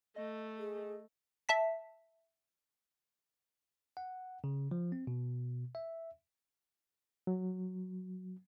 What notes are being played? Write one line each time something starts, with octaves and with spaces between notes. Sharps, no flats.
A3 D#5
G#4
E5 A5 B6
F#5
C#3
F3
C4
B2
E5
F#3